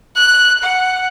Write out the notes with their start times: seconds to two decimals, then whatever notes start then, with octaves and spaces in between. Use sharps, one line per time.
0.16 F#6
0.63 F#5